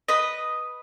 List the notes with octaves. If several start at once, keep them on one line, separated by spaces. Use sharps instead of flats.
B4 D#5